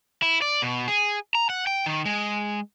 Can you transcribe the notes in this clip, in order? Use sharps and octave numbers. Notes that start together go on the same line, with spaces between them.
E4
D5
B2
G#4
A#5
F#5
G5
D#3
G#3